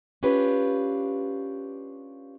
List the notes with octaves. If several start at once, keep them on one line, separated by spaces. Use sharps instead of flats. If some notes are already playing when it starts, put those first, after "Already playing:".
C#4 D4 F4 G4 B4